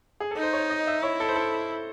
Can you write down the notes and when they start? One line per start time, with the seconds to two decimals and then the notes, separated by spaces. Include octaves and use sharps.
0.20 G#4
0.31 A4
0.37 D#4
0.43 C5
0.53 C#5
0.70 D#5
0.87 E5
1.02 E4 C#5
1.20 A4
1.28 C5
1.36 A4